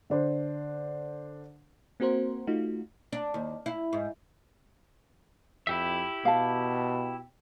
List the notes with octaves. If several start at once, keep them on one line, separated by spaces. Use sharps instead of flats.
D3 D4 C5
A#3 C4 F#4 A#4 C5
A3 D#4 F4 F#4
D4
D#2
E4
G#2
F2 E4 G4 E5
B2 F5 A5